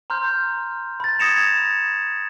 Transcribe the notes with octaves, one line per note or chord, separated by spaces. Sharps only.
A#5 C6 F6 G6
B5 A6
D#6 G#6 A#6 C#7 E7 F7